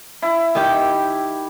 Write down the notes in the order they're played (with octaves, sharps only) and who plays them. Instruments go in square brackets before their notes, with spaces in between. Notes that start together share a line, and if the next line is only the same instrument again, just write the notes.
[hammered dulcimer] E4
[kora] D#3 G4